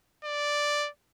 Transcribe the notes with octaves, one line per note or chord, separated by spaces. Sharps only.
D5